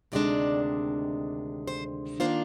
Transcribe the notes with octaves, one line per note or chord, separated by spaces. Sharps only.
D2 C3 D#3 G#3 D4 D5
C5
D#3 A#3 D4 F4 C5